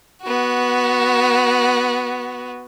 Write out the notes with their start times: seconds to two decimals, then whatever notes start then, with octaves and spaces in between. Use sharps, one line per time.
0.23 B3 F#4